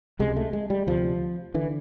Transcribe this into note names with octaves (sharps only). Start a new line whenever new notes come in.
C#2 C3 G#3
A3
G#3
G3
D2 C3 F3
D3 E3